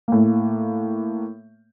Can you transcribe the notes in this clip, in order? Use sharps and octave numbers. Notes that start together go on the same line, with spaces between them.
A2 A#3